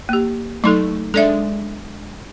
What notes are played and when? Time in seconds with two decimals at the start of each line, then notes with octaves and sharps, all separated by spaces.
0.09 A#3 G4
0.64 F#3 A3 D#4 A4
1.14 G#3 D4 A4 D5 E5